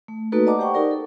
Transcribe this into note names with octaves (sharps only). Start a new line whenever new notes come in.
A3
A3 A#3 D#4 F#4 A4 B4
D5 D#5 F#5 A5 A#5 D6
G4 C5 F#5 G5 C#6
D#4 G4 A#4 D5
A4